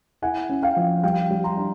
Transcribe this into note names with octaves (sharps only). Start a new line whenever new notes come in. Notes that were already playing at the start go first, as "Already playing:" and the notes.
E4 F#5 G#5
C#4
F5 G5
F3
G3 F5 G5
G3
A#5 C6
D4